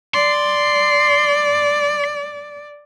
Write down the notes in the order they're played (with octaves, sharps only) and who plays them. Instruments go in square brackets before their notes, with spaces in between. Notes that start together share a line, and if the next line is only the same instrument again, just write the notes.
[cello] D5 [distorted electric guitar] C6